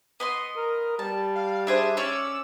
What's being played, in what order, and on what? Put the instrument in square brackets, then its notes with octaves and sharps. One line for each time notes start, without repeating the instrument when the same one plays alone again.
[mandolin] B3 D#5 C6
[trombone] A#4
[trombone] G3 [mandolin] A5
[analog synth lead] F5
[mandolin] D4 G#4 C5 [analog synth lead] E5
[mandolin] C#4 C#5 D5 [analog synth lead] E6